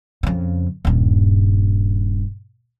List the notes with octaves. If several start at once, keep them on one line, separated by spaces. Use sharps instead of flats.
F2 C#3
D#1 G2